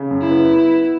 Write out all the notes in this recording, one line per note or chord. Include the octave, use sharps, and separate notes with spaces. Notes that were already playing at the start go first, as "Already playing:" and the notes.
Already playing: C#3
F#2
E4
B3